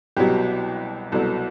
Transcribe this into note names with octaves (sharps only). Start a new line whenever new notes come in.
C2 B2 F#3 G4
C2 B2 F#3 A4